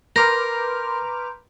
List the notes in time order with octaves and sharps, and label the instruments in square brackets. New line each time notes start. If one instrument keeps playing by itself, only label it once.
[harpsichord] A#4 [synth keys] B4 D6 F6 [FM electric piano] A#5 C6 G6 [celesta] A#6